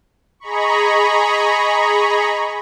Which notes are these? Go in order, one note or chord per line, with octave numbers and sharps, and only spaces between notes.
G#4 D#5 A#5 B5 C#6